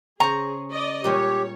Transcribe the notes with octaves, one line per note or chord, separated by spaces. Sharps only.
C#3 G#4 C5 A#5 C#6
D5 D#5
A#2 G3 G#3 G4 C#5